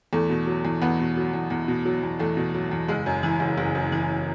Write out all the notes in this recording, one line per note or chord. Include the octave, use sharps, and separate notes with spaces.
E2 A3
B2
F#3
E2
E2 B3
B2
F#3
E2
E2
B2
F#3
E2
E2 A3
B2
F#3
E2
F#1 G#3
F#2
E3
F#1
F#1
F#2
E3